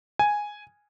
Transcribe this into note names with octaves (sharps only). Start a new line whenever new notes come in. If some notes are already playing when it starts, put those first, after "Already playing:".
G#5